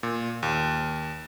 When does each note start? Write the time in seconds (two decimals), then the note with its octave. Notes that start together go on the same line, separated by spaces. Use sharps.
0.03 A#2
0.43 D#2